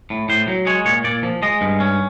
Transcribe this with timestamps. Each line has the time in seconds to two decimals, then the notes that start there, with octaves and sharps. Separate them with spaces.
0.10 A2
0.29 A2 C5
0.48 F#3
0.67 G#3 C#5
0.86 A#2 C#5
1.04 A#2 D5
1.23 F3
1.42 G#3 D#5
1.61 G2
1.80 C#4